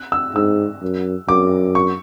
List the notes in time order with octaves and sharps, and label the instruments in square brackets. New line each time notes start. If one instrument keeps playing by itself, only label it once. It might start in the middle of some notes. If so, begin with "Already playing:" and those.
Already playing: [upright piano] F#6
E6
[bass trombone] G#2 [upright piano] E6
[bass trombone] F#2
[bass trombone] F#2 [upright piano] D6
[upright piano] C#6